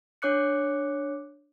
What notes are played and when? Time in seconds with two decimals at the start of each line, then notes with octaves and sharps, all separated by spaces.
0.22 D4 C#5 D6 F#6 C#7